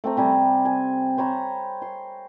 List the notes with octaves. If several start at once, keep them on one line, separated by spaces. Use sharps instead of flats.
A3 C4 A#5
C3 G3 G#5
G#5
C5 C#5 A#5 B5
C6